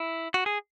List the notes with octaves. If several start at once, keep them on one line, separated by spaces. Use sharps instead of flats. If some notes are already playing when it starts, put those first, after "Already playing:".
Already playing: E4
F#4
G#4